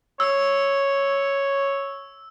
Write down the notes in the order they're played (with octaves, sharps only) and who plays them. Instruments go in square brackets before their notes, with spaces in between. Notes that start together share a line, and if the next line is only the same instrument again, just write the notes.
[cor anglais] C#5 [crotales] E6